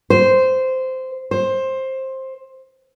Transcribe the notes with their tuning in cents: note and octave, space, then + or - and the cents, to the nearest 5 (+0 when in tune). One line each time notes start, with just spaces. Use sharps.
C5 -10
C5 +15